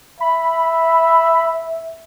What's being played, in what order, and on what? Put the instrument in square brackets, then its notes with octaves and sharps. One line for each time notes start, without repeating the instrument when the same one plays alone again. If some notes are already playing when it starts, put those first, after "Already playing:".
[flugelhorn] E5 [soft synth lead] B5